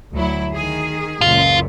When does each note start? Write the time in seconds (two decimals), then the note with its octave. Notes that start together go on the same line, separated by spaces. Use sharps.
0.14 D2 F#3 E4
0.54 D#3 G#4
1.21 C#2 F#2 A#2 F4